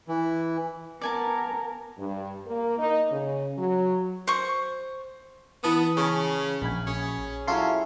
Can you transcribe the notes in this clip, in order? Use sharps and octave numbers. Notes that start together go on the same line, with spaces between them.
E3
B3 A#4 D5 G#5 A5
G2
A#3
D#4
C#3
F#3
C5 C#6
E3 B3 A5 D#6
C#3 C#4
A#1 G#5 B5
C#4 G#4
F#3 C#4 E4 F4 A4 C6